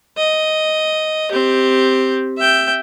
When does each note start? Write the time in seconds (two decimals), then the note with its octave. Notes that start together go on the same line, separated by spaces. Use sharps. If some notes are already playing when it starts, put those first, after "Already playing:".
0.17 D#5
1.31 C4 G4
2.37 E5 G5